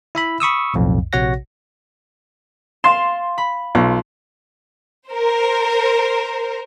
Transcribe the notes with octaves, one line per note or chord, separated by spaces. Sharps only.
E4 E5 B5
B5 C#6 D#6 E6
B1 F2 A2
A#1 C3 F#4 C#5 F#5 A#6
F5 C6 A6 E7
B5
B1 F4
A#4 C5